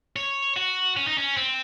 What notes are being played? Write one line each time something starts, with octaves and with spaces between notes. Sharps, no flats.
C#5
F#4
C#4
D#4
C#4
C4